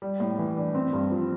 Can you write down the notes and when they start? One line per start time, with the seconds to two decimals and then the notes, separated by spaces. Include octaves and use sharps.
0.02 G3
0.20 A2
0.38 E3
0.57 D4
0.75 C4
0.93 G2
1.11 F3